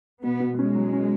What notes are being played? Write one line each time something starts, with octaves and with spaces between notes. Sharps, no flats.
B2 B3
B2
G#3 C#4
F#3
C#4